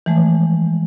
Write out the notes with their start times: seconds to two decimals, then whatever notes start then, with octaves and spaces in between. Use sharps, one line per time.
0.06 E3 F3 G#3 A3